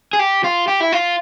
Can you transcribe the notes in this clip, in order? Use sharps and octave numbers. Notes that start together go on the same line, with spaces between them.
G#4
G4
F4
G4
E4
F4